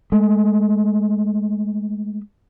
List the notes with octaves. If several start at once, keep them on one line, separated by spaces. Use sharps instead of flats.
G#3 A3